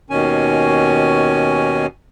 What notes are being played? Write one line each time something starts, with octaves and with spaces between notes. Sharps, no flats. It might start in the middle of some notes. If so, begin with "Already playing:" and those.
D#2 B2 D#3 C#4 G#5